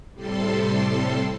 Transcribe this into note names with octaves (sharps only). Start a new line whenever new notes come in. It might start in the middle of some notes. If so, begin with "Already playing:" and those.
A2 C3 G3 A4 C6